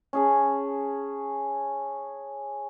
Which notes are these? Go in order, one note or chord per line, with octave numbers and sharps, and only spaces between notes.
C#4 G#4 A5